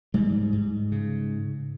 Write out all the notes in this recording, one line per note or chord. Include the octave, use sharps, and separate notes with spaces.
G#2 G3
G#2
C#3